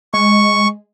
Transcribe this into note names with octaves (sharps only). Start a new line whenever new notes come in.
G#3 C#6